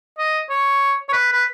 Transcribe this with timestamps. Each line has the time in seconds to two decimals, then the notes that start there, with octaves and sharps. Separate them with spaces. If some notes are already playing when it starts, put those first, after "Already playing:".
0.18 D#5
0.50 C#5
1.09 C#5
1.13 B4
1.32 B4